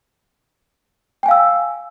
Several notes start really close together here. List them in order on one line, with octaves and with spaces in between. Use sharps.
G5 G#5 F5 E6